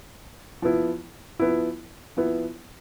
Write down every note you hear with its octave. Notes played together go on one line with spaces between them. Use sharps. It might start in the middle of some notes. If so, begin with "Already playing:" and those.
F3 B3 E4
F3 B3 E4
F3 B3 E4